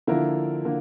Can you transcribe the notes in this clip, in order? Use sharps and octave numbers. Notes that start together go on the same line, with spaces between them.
D3 F3 A#3 E4 A#4
D3 A#3